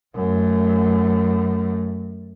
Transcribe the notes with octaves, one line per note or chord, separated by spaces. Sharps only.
F#2 A3